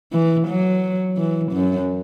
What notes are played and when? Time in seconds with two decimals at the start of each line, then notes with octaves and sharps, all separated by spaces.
0.13 E3
0.47 F#3
1.17 E3
1.52 F#2